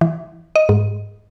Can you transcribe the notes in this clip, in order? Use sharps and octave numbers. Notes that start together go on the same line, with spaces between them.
E3
D#5
G#2